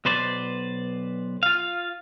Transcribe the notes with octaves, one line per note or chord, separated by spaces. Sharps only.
B1 B2 B4 C5 D5
F4 F5